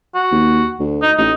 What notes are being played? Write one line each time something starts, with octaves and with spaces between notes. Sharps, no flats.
F#4
D#2
D2
D#4
A1 D#4